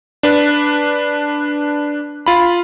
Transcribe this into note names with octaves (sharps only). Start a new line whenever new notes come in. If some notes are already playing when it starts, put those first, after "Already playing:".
D4 B4
F4 B5